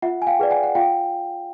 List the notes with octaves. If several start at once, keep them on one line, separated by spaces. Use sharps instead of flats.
F4 E5 F#5
G#5
F5 G5
G#4 B4 D5
F#5 G#5
F#5
F4 F5 G5